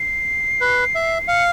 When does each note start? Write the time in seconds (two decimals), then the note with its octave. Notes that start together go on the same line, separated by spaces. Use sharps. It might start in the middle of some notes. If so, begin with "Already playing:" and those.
Already playing: C7
0.61 B4
0.95 E5
1.28 F5 C#7